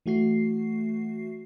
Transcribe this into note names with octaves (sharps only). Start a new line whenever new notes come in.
E3 A3 F#4 C7